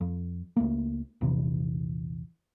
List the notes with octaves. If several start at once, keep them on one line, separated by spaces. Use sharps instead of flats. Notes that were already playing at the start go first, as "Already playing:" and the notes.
F2
C#2 A3 A#3
A#1 E2 C3 E3